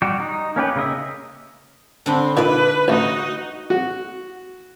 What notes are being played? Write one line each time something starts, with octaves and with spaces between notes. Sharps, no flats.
G3 F#4 G4
D#4
A#3 C#4 G4 B4
C#3 A#3 D#5 E5
D3 C4 D4 B5
A#2 D#4 B4 D5 E5
A1 A3 D#4 F#4
F#4